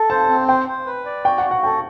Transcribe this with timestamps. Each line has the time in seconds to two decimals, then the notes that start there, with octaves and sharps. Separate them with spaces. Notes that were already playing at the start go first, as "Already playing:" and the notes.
Already playing: A4
0.10 C5 A5
0.30 C4
0.48 C5 G5
0.68 C5
0.86 B4
1.06 D5
1.25 F#4 G5
1.38 F#5
1.44 F#4
1.51 F#5
1.63 A4 G5